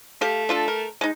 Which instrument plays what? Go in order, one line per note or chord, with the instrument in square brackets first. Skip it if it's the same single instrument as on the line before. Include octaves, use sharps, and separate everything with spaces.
[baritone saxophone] A3 [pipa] G4 F5
[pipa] D4 F4 A4
A#4
G#3 D#4